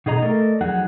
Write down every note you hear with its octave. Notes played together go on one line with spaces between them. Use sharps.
B2 D#4 G#4 D#5 A#5
A3 A4 A#4 D5 D#5
F2 F#3 D#4 G#4 F#5